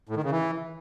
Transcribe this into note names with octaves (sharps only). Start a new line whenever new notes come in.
A2
D#3
C#3
E3